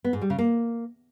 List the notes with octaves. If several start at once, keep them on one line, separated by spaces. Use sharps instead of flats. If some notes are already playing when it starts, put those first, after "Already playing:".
B3
G#2
G3
C#3
A#3